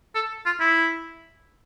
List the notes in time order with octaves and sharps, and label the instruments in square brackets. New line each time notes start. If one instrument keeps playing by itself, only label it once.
[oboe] A4
F4
E4